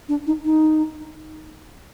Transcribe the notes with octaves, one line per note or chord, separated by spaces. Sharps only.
D4
D#4
D#4